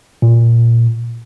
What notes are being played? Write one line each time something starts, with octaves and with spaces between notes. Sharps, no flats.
A#2